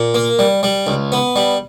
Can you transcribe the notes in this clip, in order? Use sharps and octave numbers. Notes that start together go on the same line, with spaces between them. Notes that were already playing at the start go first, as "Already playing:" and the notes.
Already playing: A#2
A#3
G3
G3
C#2
B3
G3